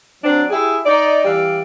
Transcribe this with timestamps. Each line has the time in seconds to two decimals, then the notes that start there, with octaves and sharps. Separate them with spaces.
0.23 F#3 C4 D4
0.50 E4 G4 G#4
0.85 D#4 D5
1.24 E3 G3 D5 F5